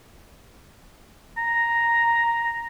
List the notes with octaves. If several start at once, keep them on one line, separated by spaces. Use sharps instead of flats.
A#5